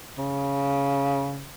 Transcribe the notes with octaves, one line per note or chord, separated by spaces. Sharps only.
C#3